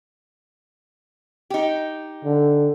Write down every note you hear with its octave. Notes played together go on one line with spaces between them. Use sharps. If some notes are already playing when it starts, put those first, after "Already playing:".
D#4 G4
D3